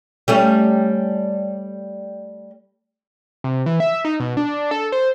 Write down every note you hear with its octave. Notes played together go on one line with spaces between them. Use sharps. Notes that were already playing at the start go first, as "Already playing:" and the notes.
G3 A3 C#4
C3
E3
E5
D#4
B2
D4
A4
C5